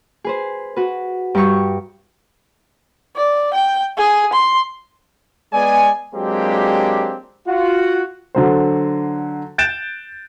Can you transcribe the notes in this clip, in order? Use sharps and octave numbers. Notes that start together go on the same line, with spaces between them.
G#4 B4 C5
F#4 B4
G2 G4 A#5 C#6
D5
G5
G#4
C6
G#3 B3 G#4 D5 G#5
F#3 G#3 A#3 C4 D4 G4
F4 F#4 F#5
D3 F#3 C5
F#6 G6 A6 D7 E7